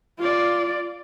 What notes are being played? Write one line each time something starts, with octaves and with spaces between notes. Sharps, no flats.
F4 D5